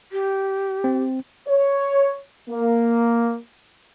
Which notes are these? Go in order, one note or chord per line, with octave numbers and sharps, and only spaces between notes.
G4
C4
C#5
A#3